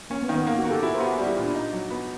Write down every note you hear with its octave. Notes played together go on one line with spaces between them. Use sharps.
A#3 C#4
B3
D#3
B3
A#3
F#4
A#3
G4 A4
E4 F#4 G#4
A#4 C5
B3 G4
F#4 G#4
G3 F#4
E4
F4
A#2
D4
D#4
F#3
B3